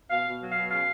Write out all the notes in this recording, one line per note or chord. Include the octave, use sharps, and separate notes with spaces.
B2 F5
B2
F#3
B2 F5
C#3 F5